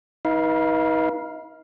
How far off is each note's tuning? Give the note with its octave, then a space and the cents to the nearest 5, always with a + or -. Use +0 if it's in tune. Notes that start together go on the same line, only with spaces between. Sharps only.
D#4 +35 B4 -35 F5 +0